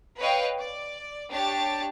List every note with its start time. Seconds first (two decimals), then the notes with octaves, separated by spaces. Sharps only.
0.18 B4 C#5 D#5 F5 G5
0.58 D5
1.30 D4 G4 C#5 A5 A6